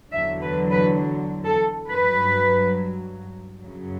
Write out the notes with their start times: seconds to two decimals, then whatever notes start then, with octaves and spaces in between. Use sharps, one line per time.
0.13 E2 D3 F#3 E5
0.42 B4
0.71 B4
1.44 A4
1.87 G2 F#3 B4
3.61 F#2 C#3 F#3